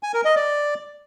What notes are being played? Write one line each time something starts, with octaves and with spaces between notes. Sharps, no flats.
G#5
A#4
D#5
D5